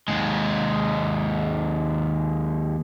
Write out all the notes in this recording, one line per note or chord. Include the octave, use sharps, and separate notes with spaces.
D#2 G#3